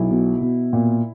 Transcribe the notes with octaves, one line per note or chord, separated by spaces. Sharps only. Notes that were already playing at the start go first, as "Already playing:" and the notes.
Already playing: B1 E4
B2
B2
A#2